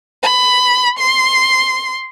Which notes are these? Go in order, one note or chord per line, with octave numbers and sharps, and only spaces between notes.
B5
C6